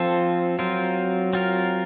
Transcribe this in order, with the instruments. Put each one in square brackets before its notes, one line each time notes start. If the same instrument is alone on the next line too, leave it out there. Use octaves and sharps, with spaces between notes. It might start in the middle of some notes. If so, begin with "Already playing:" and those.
Already playing: [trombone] F3 [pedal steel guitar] C4 F4 A4
[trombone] F#3 [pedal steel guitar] C4 F4 A#4
[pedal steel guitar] C4 F4 A#4